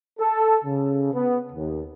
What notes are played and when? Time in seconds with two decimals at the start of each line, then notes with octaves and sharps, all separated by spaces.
0.20 A4
0.65 C#3
1.13 B3
1.53 D#2